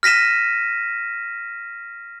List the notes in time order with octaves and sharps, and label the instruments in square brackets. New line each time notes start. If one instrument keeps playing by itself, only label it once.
[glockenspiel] F6 A#6 B6 D#7 E7